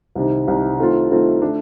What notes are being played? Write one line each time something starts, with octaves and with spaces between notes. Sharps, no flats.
C2 C3 D#3
C2 C3 D#3
D#3 A3 C4 F4
D#3 A3 C4 F4
D3 A3 D4